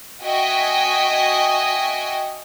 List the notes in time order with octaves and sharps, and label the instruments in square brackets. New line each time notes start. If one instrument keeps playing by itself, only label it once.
[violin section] F#4 D#5 E5 G5 G#5